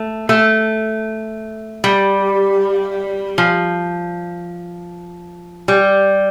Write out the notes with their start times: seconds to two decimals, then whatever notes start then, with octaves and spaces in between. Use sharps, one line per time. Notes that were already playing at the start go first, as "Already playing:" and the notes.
Already playing: A3
0.29 A3
1.84 G3
3.38 F3
5.68 G3